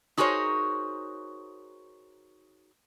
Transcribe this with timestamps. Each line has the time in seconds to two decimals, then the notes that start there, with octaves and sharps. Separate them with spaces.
0.17 D#4 F#4 G#4 A#4 C5 C#5